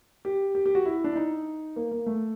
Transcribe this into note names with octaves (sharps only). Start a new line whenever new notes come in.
G4
G4
G4
F#4
E4
D4
D#4
A#3
A#3
A3